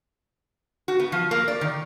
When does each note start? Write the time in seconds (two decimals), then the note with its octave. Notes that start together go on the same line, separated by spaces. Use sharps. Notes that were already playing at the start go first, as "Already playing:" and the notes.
0.88 F#4
1.00 B3
1.12 F3
1.31 A#3
1.48 D5
1.61 D#3